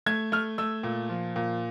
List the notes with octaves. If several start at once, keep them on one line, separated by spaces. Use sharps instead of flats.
A3 G#6
A3 F6
A3 E6
A#2
F3
A#2